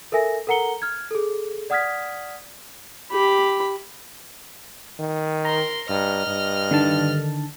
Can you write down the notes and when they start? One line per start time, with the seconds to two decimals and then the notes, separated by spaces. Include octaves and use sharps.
0.12 A4 A#4 E5 G#5 A#6
0.47 A4 A#4 F#5 A#5 C#7 G7
0.82 F6 G#6
1.11 G#4 A4
1.70 D5 F#5 D#6 F6 G#6 B6
3.11 G4 B5
4.99 D#3
5.45 A#4 A#5 C6
5.90 G2 D#5 F6
6.27 G2
6.71 D3 D#3 A5